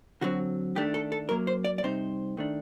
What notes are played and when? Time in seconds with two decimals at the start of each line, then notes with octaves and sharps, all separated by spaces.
0.21 D3 F#3 C4 F#4
0.75 D#3 A3 D4 G4
0.94 A4
1.12 A4
1.29 F#2 F#3 A#3 A#4
1.47 C5
1.64 D5
1.78 D5
1.83 C3 G3 C4 D#4 C5
2.37 D#3 A3 D4